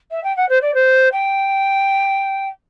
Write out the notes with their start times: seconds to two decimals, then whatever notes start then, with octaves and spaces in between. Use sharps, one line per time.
0.11 E5
0.23 G5
0.36 F#5
0.49 C5
0.61 D5
0.74 C5
1.12 G5